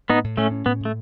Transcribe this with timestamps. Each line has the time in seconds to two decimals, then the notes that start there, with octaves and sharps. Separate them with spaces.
0.10 A2 B3 D#4
0.24 A2
0.37 A2 A3 C#4
0.51 C#4
0.66 A2 B3
0.81 A2 A3